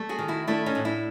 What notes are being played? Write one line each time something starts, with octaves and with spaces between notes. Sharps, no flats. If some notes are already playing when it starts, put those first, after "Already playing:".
Already playing: G3 A3
F#4 G#4
D#3
E4 F#4
A3 D4 E4
C#4 D#4
A2
D4 E4